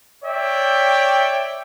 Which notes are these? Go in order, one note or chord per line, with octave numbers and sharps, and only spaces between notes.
C#5 D5 E5 G5